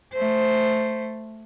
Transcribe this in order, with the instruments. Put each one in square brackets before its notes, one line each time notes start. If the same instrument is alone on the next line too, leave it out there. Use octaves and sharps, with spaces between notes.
[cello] A3 C5